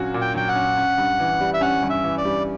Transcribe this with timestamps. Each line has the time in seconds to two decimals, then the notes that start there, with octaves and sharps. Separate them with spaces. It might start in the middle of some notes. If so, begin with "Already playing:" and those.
Already playing: A#2 F#3 C#4 F#4
0.14 A#2
0.21 G5
0.35 F#3 G5
0.49 F#5
0.55 C#4
0.77 C#4
0.98 G2
1.20 E3
1.41 G3
1.54 E5
1.61 C#4 F#5
1.83 G2
1.90 E5
2.04 E3
2.18 D5
2.25 G3